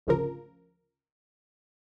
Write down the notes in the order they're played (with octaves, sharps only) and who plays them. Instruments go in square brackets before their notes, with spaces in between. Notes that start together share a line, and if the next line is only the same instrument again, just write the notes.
[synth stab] G#1 D2 C#3 F3 A#4